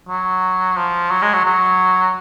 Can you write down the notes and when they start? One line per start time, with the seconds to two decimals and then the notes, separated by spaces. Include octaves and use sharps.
0.09 F#3
0.77 F3
1.11 F#3
1.22 G#3
1.33 F#3
1.45 F#3